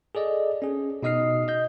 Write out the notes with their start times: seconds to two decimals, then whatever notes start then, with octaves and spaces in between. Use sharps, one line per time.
0.15 G#4 A4 D5 D#5
0.62 C#4 G#4
1.03 B2 D#4 D#5 D#6 F6 C7
1.48 D#5 G6